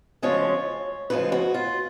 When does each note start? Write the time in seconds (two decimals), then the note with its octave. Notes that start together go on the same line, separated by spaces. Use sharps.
0.22 D2 C#3 F3 G#3 C#5
1.10 D2 C#3 F3 G#3 B4
1.32 F#4
1.54 F4